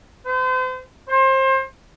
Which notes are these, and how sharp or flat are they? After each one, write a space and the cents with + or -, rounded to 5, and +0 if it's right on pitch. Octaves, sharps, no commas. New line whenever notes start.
C5 -40
C5 +30